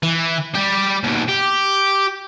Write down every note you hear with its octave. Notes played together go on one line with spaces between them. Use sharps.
E3
G3 G4
D#2 B2
G4